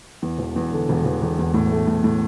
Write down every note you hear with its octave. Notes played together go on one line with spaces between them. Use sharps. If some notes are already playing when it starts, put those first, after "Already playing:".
E2
E1
E2
D3
E1
E1
E1
E2
A2
A3
A2
A2